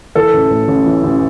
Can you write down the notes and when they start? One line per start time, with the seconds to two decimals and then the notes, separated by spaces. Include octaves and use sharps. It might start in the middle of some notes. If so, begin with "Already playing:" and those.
0.15 E3 A4
0.33 A1
0.51 A2
0.68 A1
0.86 E3
1.04 A1